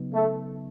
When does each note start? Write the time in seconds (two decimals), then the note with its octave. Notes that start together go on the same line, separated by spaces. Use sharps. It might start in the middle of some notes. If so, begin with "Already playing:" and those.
Already playing: C#3 F#3 B3 D#4
0.14 A3